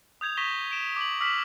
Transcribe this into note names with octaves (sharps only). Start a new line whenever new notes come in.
D#6 G6 G#6 F7
C#6 D#6 A#6 B6 E7 G7
D7 E7
D6 F#7
D6 E6 F6 B6 F#7